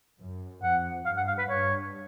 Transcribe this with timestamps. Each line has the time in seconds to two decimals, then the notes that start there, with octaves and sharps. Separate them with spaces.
0.20 F#2
0.63 F2 F#5
1.06 G2 F5
1.17 F#5
1.27 F5
1.38 B4
1.49 G2 C#5